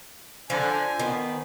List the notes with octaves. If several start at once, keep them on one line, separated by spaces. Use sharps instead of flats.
D3 F3 G#5
D#3 B3 C5